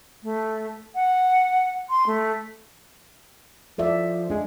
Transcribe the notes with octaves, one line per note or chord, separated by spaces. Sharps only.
A3
F#5
C6
A3
F3 A4 D5 E5
G#3 D4